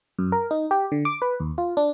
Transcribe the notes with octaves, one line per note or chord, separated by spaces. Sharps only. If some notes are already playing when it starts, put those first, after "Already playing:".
F#2
A#4
D#4
G4
D3
D6
B4
D#2
F4
D4